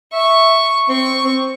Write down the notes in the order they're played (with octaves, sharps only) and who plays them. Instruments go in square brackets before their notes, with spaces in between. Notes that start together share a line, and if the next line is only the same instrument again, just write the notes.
[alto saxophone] E5 [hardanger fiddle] C#6
[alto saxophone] C4 [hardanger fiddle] C#6
[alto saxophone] C4